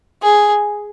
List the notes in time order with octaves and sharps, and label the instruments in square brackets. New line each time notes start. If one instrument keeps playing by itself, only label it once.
[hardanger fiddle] G#4